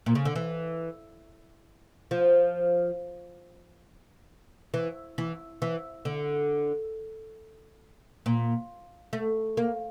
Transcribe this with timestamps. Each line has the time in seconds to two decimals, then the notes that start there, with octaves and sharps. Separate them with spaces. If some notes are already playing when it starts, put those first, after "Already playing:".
0.06 A#2
0.15 C#3
0.25 D3
0.36 E3
2.11 F3
4.74 E3
5.18 E3
5.62 E3
6.05 D3
8.26 A#2
9.13 A3
9.57 A#3